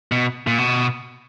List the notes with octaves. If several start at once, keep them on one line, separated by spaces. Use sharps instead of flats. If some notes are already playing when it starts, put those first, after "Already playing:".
B2
A#2
B2